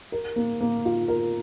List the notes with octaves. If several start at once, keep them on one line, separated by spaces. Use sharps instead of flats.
A#4
A#3
A#3
F4
A#4